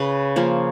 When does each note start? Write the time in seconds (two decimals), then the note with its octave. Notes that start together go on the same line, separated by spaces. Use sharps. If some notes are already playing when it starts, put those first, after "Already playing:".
Already playing: C#3 B4
0.36 F3 A#3 C#4